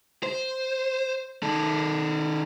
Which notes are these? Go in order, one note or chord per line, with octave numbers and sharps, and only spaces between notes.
C5
D#3 A4